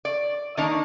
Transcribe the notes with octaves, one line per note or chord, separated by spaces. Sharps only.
D5
D#3 A#3 D4 D#4